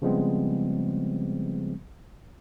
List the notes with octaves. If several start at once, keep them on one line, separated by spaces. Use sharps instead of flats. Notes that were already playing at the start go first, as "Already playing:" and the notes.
C#3 F3 G3 G#3 B3 C4